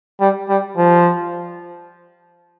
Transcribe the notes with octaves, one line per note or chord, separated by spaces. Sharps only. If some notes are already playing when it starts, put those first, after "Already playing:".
G3
G3
F3